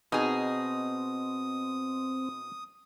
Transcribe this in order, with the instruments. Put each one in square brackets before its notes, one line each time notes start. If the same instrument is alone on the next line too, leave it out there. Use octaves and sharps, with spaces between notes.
[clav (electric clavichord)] B2 [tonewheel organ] C4 [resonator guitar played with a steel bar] D#4 G#4 [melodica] D#6